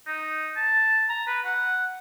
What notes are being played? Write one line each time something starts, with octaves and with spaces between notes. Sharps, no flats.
D#4
A5
A#5
B4
F#5